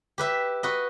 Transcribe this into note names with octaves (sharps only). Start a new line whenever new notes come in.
G4 B4 E5
F#4 B4 D#5